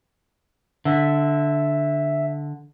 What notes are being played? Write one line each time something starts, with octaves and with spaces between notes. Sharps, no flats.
D3 E5